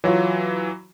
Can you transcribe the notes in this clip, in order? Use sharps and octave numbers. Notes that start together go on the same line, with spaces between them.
E3 F#3 F4 C#5